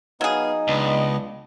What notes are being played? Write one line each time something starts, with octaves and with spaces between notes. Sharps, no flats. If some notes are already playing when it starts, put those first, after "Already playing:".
F#3 B3 D#4 G#4 F5
C#2 B3 D4 D#5